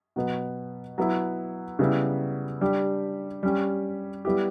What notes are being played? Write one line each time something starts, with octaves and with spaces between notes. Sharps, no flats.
B2 F#3 B3
F#3 B3 E4
C#3 G3 B3 E4
G3 D4 G4
G3 C#4 G4
G3 B3 E4 G4